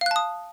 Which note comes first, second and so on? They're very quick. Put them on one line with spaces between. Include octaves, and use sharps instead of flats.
F5 F#6 A5 D#6